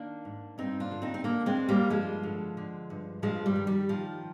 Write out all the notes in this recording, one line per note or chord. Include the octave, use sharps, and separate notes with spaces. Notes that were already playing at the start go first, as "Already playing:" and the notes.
Already playing: D#3 A#3 D4
G#2
G2 C4 D#4
D4 F4
D3
C4 D#4
C4
D3 A#3 D4
G#3 C4
G2
G3 A#3
G2 F3 G#3
D3
D3
G2
G2 F3 G#3
G3
D#3
G3
D#3 F3